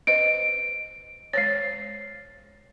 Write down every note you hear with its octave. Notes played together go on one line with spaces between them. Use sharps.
B4 C5 D#5 D7
G#3 C5 C#5 A6 C7